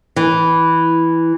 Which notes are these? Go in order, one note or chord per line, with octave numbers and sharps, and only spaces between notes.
E3